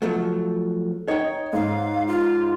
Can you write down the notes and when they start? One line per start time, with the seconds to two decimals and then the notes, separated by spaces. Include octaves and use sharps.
0.02 F3 F#3 A3
1.08 D#4 C#5 G5
1.53 G#2 F5
2.08 F4